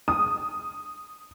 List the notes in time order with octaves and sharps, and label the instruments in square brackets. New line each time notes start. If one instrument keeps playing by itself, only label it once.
[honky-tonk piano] D#6